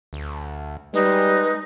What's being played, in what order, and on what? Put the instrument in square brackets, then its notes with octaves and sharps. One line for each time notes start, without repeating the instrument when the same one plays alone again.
[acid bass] D2
[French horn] G3 [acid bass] G#3 [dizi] D#4 [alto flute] B4